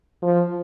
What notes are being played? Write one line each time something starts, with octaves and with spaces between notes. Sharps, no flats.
F3